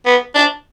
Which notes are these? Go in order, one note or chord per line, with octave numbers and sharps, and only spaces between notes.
B3
D4